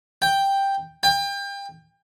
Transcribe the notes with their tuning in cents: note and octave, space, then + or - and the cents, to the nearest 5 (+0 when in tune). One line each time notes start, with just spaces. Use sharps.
G5 +5
G5 +30